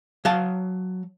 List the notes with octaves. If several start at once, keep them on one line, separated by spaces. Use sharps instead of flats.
F#3 F5 A5